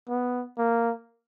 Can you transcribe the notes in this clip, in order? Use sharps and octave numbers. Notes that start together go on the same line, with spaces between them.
B3
A#3